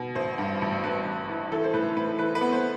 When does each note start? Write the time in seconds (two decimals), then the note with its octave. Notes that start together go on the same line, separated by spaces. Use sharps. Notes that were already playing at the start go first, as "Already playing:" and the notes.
Already playing: B2
0.15 A1 C5
0.38 G2
0.62 A1
0.83 G2 B4
1.05 A1
1.29 E3
1.51 E3 A4
1.64 C5
1.74 A2 B4
1.97 A2 B4
2.18 E3 B4
2.35 B4
2.41 B3
2.52 C5